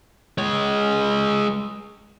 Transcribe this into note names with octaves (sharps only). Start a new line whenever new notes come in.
G#3 C#5